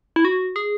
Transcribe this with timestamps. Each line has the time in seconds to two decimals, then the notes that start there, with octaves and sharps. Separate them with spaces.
0.16 E4
0.25 F#4
0.56 G#4